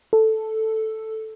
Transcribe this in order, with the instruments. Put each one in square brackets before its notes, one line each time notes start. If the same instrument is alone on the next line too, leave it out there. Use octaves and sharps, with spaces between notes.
[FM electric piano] A4